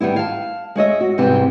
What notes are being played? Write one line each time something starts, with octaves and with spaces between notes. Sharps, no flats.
D#3 G3 B3 E4
F5 A5
G#3 C#5 D#5 E5
F#4
G#2 C3 E3 G3 B3 G4